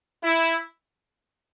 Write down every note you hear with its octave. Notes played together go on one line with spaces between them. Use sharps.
E4